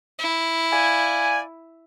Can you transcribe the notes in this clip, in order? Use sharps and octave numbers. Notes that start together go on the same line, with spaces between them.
E4
D5 F5 G#5